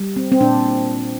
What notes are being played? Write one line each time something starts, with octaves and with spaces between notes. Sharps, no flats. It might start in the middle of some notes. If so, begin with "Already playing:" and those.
Already playing: G3
C4
C4
A#2 D4